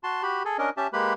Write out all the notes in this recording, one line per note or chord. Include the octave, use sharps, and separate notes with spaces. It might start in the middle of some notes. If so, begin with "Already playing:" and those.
F#4 A5 C6
F#4 G4 B5
G#4 A4
C#4 D4 A#4 D#5
C#4 G4 E5 A5
G#3 A#3 G4 B4 B5